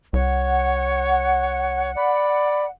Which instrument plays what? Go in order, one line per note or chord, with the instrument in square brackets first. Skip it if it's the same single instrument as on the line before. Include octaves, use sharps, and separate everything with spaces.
[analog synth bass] C2 [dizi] C#5 [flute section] F#5
[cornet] D5 [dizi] B5